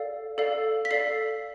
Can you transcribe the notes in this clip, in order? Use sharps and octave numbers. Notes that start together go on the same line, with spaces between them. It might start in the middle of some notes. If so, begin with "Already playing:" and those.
Already playing: A4 D5 F5
A4 D5 F5
B6
A4 D5 F5 C7